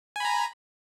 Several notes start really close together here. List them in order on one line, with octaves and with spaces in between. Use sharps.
G#5 B5 A#5